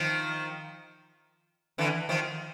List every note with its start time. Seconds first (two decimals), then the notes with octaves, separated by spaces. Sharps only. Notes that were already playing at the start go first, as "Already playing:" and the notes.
Already playing: D#3 F3
1.78 D3 E3
2.09 D#3 F3